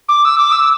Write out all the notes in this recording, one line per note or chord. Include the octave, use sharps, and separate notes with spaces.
D6
E6
D6
E6